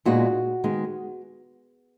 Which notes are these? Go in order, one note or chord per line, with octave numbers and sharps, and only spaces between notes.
A#2 G#3 B3 D#4 F#4
D#3 G#3 B3 D#4